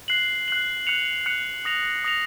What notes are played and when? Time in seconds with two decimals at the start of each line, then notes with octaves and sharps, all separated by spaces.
0.08 F#6 C7 F#7
0.48 F#6 C7 F#7
0.87 F#6 C#7 F7
1.26 F#6 C#7 F7
1.65 D#6 A#6 F7
2.04 D#6 A#6 F7